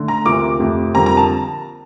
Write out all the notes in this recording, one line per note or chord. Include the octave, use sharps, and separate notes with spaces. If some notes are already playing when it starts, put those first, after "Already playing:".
Already playing: D3 A3
A#5
D2 C3 F3 A#3 D6
F2 C3 F3 A3
F2 D3 G3 A#3 A#5
A#5
A5